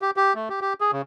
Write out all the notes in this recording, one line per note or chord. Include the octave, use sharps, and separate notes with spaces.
G4
G4
A3
G4
G4
G#4
C#3